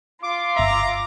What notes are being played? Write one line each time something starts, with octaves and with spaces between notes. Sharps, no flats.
F4 D6
G1 E5 A#5